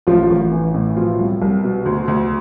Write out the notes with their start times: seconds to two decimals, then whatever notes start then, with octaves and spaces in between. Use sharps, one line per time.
0.07 A1 F3 F4
0.30 A1
0.51 E3
0.74 A2
0.96 B2 F3 F4
1.19 C2
1.42 C2
1.63 B2
1.86 D2
2.08 D2